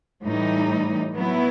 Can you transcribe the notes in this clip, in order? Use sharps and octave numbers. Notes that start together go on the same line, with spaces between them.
A2 E3 G3 D#4
F#3 B3 E4